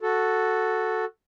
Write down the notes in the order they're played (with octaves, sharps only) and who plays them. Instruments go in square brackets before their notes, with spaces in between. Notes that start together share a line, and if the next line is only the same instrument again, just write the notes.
[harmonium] F#4 A4